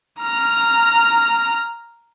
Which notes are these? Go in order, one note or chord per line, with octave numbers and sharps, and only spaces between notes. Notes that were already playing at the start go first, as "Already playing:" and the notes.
A#5 F6